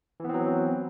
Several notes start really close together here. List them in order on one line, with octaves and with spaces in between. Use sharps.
E3 B3 C4 F#3